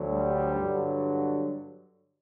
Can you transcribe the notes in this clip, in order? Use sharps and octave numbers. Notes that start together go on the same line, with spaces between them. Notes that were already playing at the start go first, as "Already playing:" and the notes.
Already playing: D2 D3 F#3
G3
G2 D3 F#3